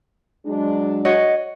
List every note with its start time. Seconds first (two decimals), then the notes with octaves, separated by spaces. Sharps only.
0.46 F#3 G#3 D4
1.05 F#4 C#5 D#5